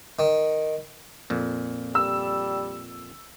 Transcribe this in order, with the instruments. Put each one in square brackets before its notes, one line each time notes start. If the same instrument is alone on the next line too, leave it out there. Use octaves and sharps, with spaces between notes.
[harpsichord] D#3
[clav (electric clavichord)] F2 A#2
[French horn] G3 [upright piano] E6